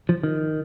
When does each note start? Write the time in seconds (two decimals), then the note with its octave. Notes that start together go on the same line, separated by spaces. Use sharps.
0.09 F3
0.23 D#3